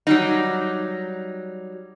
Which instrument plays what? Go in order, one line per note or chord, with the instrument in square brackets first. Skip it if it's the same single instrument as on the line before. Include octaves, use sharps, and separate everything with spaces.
[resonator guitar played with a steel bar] F#3 G3 D#4